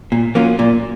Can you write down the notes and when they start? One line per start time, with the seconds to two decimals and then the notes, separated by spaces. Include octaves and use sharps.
0.12 A#2
0.35 F#3 A#3 C#4 F4
0.59 A#2